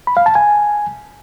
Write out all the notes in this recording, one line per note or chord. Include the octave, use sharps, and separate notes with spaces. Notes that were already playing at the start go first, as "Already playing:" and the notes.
B5
F5
A5
G#5